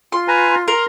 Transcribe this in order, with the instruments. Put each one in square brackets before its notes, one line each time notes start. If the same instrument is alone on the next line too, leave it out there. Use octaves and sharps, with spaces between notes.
[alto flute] F4 [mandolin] C6
[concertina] B4 G#5 A#5
[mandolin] A#4 [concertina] A#5 C6